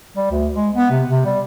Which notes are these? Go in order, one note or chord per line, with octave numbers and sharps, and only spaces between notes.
G3
D2
G#3
B3
C3
C3
G3